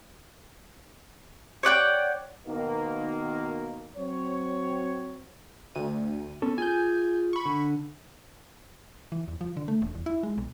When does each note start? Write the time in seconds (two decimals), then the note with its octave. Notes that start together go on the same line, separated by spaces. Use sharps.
1.63 C#5 D5 F#5 G5
2.47 B2 D#3 A#3
3.96 F#3 C4 C#5
5.75 D2 D#7
6.42 B3 C#4 A4
6.58 F4 G#4 G#5 G6
7.33 B5 C#6
7.45 D3
9.12 E3
9.28 E2
9.41 F3
9.57 D3
9.68 A3
9.82 E1
9.95 E2
10.06 E4
10.23 G#3
10.38 B1